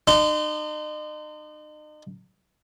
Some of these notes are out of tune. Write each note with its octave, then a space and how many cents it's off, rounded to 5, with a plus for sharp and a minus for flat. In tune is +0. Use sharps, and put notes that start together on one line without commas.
D#4 -40 C6 -25